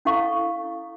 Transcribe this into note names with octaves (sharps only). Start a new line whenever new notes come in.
C#4 E4 A4 F5 C#6